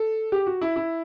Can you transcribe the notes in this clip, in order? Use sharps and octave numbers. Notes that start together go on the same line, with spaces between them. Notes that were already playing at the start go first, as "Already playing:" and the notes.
Already playing: A4
G4
F#4
E4
E4